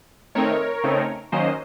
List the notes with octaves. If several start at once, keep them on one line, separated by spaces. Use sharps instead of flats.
D#3 A3 C4 D#4 A#4 C#5
C#3 A3 C4 D#4
D#3 F#3 A#3 C#4 C5 D#5